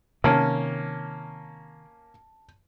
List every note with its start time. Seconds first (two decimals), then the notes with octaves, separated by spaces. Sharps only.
0.24 C3 D#3 A#3 C#4 A5